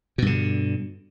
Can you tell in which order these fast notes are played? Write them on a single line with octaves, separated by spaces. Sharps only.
B2 G2 D3